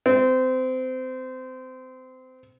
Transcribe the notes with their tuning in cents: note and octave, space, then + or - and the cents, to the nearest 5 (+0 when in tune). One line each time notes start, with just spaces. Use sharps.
C4 -25